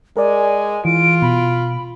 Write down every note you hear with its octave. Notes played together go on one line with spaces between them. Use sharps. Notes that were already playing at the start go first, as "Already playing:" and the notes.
G#3 A#4 D5 G#5
E3 F4 D7
B2 B5